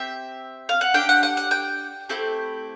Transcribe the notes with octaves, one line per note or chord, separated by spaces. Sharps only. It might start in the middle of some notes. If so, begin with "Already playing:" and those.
Already playing: C4 G4 E5
F5
F#5
D4 G4 G5
F#5
F#5
F#5
G5
A3 C4 E4 G4